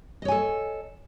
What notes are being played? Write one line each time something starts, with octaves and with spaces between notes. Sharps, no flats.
A4 C#5 D#5 G#5